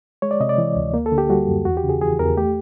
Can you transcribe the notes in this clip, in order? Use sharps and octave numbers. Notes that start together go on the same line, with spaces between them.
G#3 C#5
D5
C3 D#5
D5
E3
D2
A#3
A4
D3
G4
G3 F#4
F#2
E2 F#4
G4
C#3
G#4
E3 G#4
E2 A#4
A3 G4